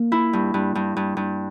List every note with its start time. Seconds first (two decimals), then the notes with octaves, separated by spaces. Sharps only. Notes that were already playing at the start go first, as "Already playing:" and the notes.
Already playing: A#3
0.12 E4
0.33 G2
0.54 G2
0.75 G2
0.97 G2
1.17 G2